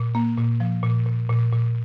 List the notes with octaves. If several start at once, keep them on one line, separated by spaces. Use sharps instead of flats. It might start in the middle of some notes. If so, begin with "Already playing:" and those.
Already playing: A#2
A#3
A#2
F3
A#2
A#2
A#2
A#2